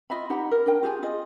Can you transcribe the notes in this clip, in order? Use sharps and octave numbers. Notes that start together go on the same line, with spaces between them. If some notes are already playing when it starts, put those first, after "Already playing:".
F4 D#5 E5 B5
D#4 G4 F#5 B5
A#4
D4 A#4 G5
F4 G4 G#4 G#5
F4 G#4 D#5